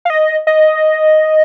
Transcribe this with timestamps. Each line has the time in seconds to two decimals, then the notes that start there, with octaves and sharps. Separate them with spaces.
0.05 F5
0.10 D#5
0.47 D#5